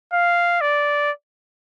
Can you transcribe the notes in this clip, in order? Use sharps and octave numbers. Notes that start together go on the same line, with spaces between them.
F5
D5